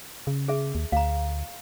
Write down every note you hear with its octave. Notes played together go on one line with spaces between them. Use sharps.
C#3
G#4 E5
D#2
D2 F5 A#5